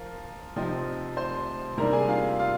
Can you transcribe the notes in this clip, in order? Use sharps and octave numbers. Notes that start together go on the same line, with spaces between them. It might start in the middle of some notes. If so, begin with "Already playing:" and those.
Already playing: F3 F4 A#4
C3 F3 C4 D#4
C5 C6
C3 D#3 G3 A#3 D4 A#4 A#5
G#4 G#5
F4 F5
F4 F5